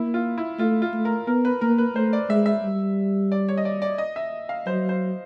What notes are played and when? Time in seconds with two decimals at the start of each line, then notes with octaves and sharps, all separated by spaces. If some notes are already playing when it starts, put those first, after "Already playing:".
Already playing: A#3 E4
0.14 F4
0.38 E4
0.59 A3 F4
0.82 F4
0.94 A3
1.05 A#4
1.27 B3 A#4
1.45 B4
1.61 A#3 A#4
1.78 B4
1.95 A3 C5
2.13 D5
2.30 G#3 E5
2.46 E5
2.63 G3
3.32 D5
3.49 C#5
3.57 D#5
3.65 D5
3.82 D5
3.98 D#5
4.16 E5
4.49 F5
4.67 F#3 C5
4.89 C5